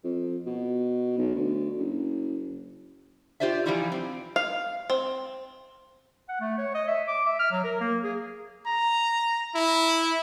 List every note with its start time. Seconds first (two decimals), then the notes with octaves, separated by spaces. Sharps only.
0.04 F2
0.46 B2
1.18 B1
1.35 D2
1.78 F#1
3.40 F4 G4 C5 D5 E5
3.66 E3 F3 G3 D#4 E4 D5
3.92 C4
4.36 F5
4.90 C4
6.29 F#5
6.40 A3
6.58 C#5
6.74 D#5
6.88 E5
7.08 D6
7.26 E5
7.39 F6
7.52 F#3
7.64 A#4
7.81 A#3
8.03 G#4
8.66 A#5
9.55 E4